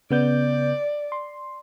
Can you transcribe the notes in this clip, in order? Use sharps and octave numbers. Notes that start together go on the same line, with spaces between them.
C#3 B3 D5 G6
C6